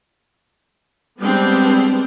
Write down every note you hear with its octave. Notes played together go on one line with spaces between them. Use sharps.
G3 G#3 B3 C4 D4